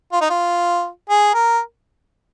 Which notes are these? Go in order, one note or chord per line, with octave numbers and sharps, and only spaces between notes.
F4
D#4
F4
G#4
A#4